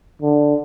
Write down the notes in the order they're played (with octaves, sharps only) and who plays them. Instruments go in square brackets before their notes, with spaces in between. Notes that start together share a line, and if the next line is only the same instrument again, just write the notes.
[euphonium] D3